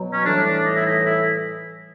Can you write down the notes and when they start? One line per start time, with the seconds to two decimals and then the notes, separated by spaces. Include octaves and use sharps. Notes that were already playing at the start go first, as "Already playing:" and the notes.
Already playing: B2 F#3
0.13 C#4
0.25 A2 E3 G3 D4
0.45 D4
0.65 D#4
0.76 E4
0.86 D#4
1.06 E4